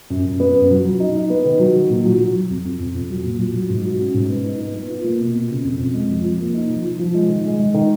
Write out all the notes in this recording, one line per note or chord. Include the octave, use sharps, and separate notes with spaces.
F#2
F#2
B3
F#2
F#3
F#3
D#4
D#4
B3
D#3
F#3
D#3
A#2
F#3
F#3
F#3
F2
F2
F2
F2
F#3
A#2
F#3
F#3
G#2
F#4
C#4
G#2
B3
D#4
B3
B3
F4
A#3
B2
B2
C#3
F2
F2
G#3
F3
F3
A#3
D#4
F3
F3
F3
G#3
D#3
G#3
G#3
D#3